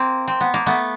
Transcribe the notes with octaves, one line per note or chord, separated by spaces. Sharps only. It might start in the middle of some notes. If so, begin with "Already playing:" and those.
Already playing: A#3 C4
C4
B3
A#3
A3 B3